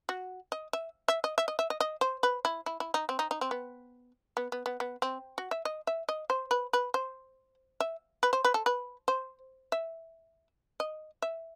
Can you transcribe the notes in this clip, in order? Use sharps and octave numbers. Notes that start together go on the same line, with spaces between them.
F#4
D#5
E5
E5
D#5
E5
D#5
E5
D#5
D#5
C5
B4
E4
E4
E4
D#4
C4
D#4
D#4
C4
B3
B3
B3
B3
B3
C4
F#4
E5
D#5
E5
D#5
C5
B4
B4
C5
E5
B4
C5
B4
A4
B4
C5
E5
D#5
E5